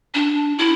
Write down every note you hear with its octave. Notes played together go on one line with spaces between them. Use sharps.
D4
E4